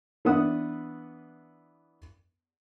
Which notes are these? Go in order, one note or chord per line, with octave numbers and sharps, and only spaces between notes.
E3 B3 D4 B4 F#5 D#6